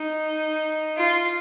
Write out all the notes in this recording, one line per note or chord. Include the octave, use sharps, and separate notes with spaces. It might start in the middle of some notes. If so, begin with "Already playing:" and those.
Already playing: D#4
F4